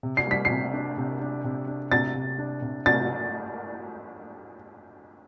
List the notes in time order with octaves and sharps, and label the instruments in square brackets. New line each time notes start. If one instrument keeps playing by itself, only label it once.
[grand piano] C3
[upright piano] C7
[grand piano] G3 [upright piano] B6
[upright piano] C7
[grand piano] C3
D4
C3
D4
C3
D4
[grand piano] C3 [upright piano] A6
[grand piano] C3
D4
C3
[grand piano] C3 [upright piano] A6